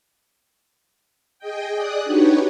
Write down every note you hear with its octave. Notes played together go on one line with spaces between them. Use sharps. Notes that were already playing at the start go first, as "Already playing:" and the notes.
G#4 D#5 G5
G#4 D5 D#6 F#6
D4 D#4 F#4 G4 B4 C#5